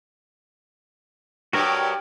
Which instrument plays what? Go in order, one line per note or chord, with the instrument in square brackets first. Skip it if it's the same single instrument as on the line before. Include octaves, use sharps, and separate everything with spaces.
[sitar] G2 [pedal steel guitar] F#4 A#4 C#5 [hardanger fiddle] G4 D5